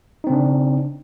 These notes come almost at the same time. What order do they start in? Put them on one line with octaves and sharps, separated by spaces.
D#4 C4 C#3 D4